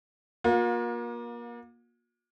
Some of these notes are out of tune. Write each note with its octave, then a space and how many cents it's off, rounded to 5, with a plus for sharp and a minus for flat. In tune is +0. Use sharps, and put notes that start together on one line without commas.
A#3 +30 F4 +45